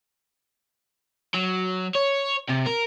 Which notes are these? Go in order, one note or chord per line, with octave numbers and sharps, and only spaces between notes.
F#3
C#5
C3
A#4